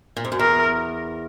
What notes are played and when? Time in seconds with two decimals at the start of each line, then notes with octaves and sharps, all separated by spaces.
0.17 A#2
0.25 G#2
0.32 F#2
0.39 E2 A#4